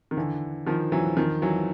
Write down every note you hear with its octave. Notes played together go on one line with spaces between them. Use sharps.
D#3
D3 E3
D#3 F3
E3 F#3
D#3 F3
E3 F#3